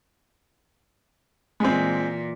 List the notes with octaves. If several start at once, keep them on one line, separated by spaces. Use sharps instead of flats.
A#2 E3 G#3 C4